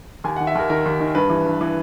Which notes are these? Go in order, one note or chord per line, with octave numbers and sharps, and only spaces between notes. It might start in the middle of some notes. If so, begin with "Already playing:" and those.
D#2 G#5
D#3 F#5
E5
D#2 A#4
D#3 A#4
D#2
D#3
G2 B4
E3
G2
E3